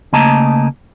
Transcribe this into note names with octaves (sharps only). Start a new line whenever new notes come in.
C#3 A3 A#3 D#5 A5 A#5